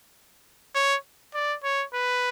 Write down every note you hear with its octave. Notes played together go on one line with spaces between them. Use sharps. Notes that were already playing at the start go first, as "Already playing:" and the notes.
C#5
D5
C#5
B4